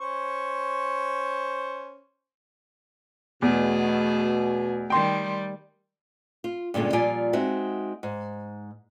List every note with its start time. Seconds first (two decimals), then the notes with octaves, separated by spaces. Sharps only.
0.01 C#4 C5 C#6
3.42 E2 B2 A3 G#4
4.90 D#3 G3 G5 C6
6.44 F4
6.74 G2 A#2 D3 G#3 C#4
6.93 A#2 F3 G3 F4 D5 G#5
7.33 G#3 C4 D#4 F#4 E5
8.03 G#2